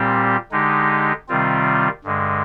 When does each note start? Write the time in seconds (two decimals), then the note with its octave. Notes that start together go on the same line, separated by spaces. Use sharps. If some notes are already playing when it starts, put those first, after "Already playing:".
Already playing: A#2 G3 C4 G4
0.52 D3 G#3 D#4 G4
1.29 C3 D#3 G3 C4 F4
2.04 G2 D3 G#3